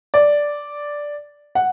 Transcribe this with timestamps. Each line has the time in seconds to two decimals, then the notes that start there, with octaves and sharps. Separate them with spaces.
0.14 D5
1.55 F#5